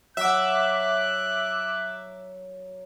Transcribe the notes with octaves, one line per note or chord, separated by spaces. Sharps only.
F#3 E5 D6 F#6